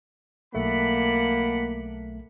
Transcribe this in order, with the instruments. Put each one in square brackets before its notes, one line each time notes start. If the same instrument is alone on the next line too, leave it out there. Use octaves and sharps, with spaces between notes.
[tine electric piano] B1 A3 [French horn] A#3 [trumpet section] D4 F#5 B5